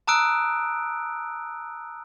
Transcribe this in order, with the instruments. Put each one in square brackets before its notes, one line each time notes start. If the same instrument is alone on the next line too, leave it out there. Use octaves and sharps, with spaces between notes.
[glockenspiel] A5 A#5 D#6 E6 F#6 D7